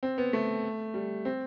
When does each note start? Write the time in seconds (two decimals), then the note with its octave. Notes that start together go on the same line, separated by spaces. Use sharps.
0.03 C4
0.18 B3
0.33 A3
0.94 G3
1.25 C4